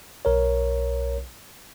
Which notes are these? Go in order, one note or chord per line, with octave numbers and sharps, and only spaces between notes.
B1 A#4 C#5